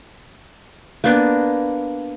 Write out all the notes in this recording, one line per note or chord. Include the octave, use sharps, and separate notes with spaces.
A#3 B3 D4 G5